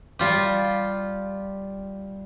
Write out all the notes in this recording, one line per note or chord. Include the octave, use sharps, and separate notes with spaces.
G3 F4 G4